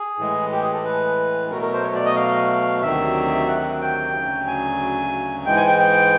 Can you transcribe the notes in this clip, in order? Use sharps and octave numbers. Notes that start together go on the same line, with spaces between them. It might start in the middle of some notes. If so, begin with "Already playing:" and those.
Already playing: G#4
A2 E3 G#3
G4
G#4
A4
B4
B2 F#3 A3 A#4
A#4
C5
C#5
D5
D#5
F5
D2 C3 D#3 F#3 E5
F#5
G5
D2 C#3 F#3
G#5
G#2 E3 G#3 G5
G#5
G5
G5